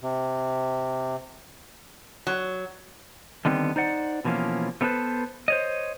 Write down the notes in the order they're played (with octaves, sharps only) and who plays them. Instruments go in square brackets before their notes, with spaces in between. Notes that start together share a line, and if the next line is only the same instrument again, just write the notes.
[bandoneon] C3
[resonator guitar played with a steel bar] F#3
[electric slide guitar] D3 D#3 G3 B3 C4
D#4 C5 D5 F#5
B2 E3 F3 G#3 A#3 C#4
A3 B3 C#4 A4 B4 C5
C5 C#5 D#5